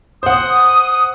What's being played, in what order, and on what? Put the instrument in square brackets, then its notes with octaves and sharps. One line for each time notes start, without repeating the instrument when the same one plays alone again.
[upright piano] C5 F#5 [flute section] D#6